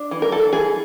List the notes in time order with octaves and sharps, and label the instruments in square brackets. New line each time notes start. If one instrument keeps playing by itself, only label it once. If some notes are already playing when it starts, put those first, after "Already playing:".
Already playing: [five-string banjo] D4
E3
A#4
E3 A4
E3 G#4